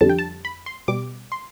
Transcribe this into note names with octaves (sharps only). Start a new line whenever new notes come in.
F2 D3 G3 A5
G5
A5
B5
C6
B2 G3 D6
C6